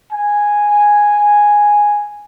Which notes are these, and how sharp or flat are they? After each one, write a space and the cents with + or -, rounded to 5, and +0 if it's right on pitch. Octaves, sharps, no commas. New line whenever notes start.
G#5 -5